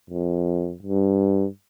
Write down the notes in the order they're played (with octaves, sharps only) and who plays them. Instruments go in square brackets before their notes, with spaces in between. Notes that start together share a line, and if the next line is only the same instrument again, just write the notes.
[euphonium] F2
G2